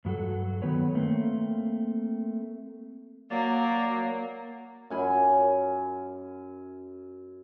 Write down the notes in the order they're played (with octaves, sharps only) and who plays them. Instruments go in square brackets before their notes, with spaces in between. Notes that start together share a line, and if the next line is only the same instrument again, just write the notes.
[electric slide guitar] G2 F#3 F#4 A4
D#3 B3 B4 C#5
A3 A#3 C4
[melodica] F#3 D5 [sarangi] A#3
[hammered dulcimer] F#2 G#5 B5